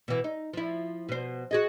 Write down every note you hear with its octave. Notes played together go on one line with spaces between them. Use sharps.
B2 E3
D#4
F3 E4
B2 C5
F#4 G#4 D#5